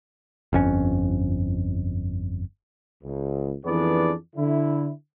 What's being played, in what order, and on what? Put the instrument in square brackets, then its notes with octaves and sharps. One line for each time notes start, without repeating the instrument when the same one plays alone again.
[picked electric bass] G1 F2 C#4
[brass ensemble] C#2
F2 E3 B3 D4 G#4 D5
D3 E4